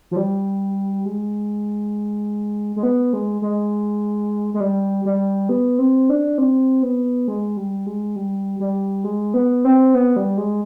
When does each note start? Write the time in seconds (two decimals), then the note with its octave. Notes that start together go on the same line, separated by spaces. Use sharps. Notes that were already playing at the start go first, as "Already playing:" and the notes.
0.11 F3
0.16 G3
1.05 G#3
2.76 G#3
2.83 B3
3.13 G#3
3.42 G#3
4.54 G#3
4.60 G3
5.05 G3
5.49 B3
5.79 C4
6.09 D4
6.38 C4
6.83 B3
7.28 G#3
7.57 G3
7.86 G#3
8.16 G3
8.60 G3
9.04 G#3
9.34 B3
9.65 C4
9.94 B3
10.16 G3
10.37 G#3